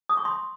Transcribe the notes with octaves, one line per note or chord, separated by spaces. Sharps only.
D#6
C#6
C6